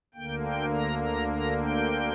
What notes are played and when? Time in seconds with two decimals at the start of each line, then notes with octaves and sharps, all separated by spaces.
0.14 D2 D3 A#3 G5
0.45 G5
0.74 A#5
1.03 A#5
1.33 A#5
1.63 G5